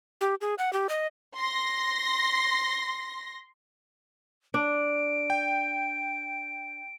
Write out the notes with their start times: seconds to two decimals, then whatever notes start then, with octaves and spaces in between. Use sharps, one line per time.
0.21 G4
0.41 G#4
0.58 F#5
0.73 G4
0.89 D#5
1.36 C6 A#6
4.54 D4 D7
5.30 G5